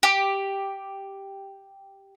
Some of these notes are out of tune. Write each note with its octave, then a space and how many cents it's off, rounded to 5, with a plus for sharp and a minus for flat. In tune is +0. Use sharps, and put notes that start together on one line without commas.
G4 +0